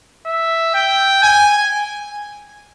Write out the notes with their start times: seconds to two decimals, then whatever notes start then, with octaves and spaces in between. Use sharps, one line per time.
0.26 E5
0.74 G5
1.22 G#5